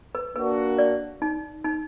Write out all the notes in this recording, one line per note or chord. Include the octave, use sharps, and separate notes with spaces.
B4
A#3 D4 F#4 B4
D5
D#4
D#4